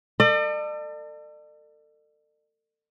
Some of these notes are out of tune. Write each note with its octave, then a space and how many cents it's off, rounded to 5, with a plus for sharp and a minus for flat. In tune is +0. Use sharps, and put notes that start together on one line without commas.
A4 +35 D5 +45